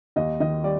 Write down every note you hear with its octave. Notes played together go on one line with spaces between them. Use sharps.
D#2 D#5
D#3 D#5
G3 D5